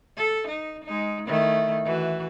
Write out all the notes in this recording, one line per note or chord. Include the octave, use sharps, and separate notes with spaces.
A4
D#4
G#3 D#4
D#3 A3 E4
E3 F#4